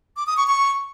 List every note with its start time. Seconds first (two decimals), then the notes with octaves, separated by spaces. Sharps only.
0.17 D6
0.27 D#6
0.37 C#6
0.47 C#6